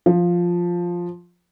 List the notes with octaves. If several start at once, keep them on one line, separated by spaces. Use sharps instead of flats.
F3